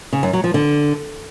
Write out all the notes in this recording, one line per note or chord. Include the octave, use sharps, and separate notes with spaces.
C#3
F#2
F#3
F3
D3